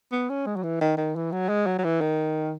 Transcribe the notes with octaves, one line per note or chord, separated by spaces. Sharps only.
B3
C#4
G#3
F#3
E3
D#3
D#3
E3
F#3
G#3
F#3
F#3
E3
D#3